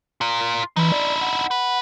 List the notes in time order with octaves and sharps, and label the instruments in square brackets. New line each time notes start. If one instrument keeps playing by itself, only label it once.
[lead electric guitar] F4 A#4
[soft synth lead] E3 [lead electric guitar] D#4 E4
[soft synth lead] D5
F#5
[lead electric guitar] B4